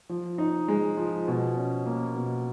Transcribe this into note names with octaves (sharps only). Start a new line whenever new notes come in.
F3
D#4
G#3
F3
B2
C#4
A#3
B2